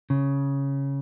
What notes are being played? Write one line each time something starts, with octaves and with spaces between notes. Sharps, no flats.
C#3